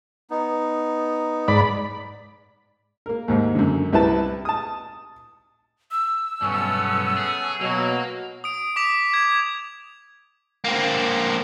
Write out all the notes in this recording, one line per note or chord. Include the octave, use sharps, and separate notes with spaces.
B3 D#4
G#2 D5 B5
A#3 A#4
D#2 G#2
F#2 D3
C2 E4 B4 A5
A5 D#6
E6
B1 G2 A3 B3 C#4
G#4
B2 F#3 A#3
D#6 D7
D6 B6 F7
G#6
A#3 C4